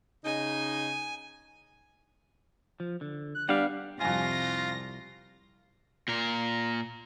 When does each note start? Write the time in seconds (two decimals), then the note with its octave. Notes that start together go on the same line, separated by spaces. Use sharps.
0.25 C#3 D#4 G#5
2.80 F3
3.01 D3
3.35 F#6
3.49 G3 B3 D4 F5 F#5
4.00 C2 F2 F4 G#5 A#6
6.08 A#2 A#4